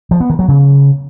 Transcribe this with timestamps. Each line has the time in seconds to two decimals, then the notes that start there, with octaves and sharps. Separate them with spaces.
0.11 F3
0.20 B3
0.30 D#3
0.39 F#3
0.48 C#3